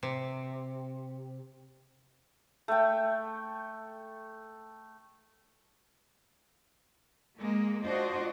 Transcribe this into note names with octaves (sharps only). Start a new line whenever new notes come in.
C3
A3 G5
G#3 A#3
D4 F4 F#4 C5 D#5